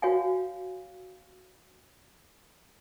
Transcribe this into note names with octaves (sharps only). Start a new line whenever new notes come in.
F#4 C#5 F5 F#5 G#5